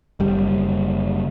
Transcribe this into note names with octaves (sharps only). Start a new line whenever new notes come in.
F#1 G3